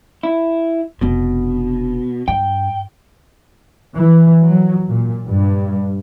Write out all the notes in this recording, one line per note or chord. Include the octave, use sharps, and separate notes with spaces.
E4
F1 B2 D4
G2 G5
E3
F#3
A#2
G2